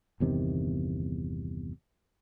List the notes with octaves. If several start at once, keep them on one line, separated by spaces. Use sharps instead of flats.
G1 E2 C3 D#3